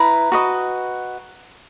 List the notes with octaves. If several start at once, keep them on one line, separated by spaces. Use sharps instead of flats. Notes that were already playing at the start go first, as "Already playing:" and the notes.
Already playing: E4 B4 A#5
F#4 B4 D#5